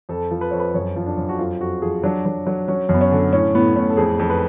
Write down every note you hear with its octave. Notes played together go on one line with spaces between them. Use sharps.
F2 A4
F3
B4
F2 C#5
B4
F#2 C#5
F3
D4
F#2
F#4
F2 F4
F2 F#4
F3 G#4
F#3 D4
F#3
F#3
F#3 C#4
F#2 B3
C#4
D3
A2 C#4
A2 B3
A2 C#4
A4
F2 G#4
F2
B4